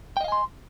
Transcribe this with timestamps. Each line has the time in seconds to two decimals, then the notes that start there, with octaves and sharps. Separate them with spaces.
0.17 G5
0.20 D#5
0.24 F5
0.28 G#5
0.32 C6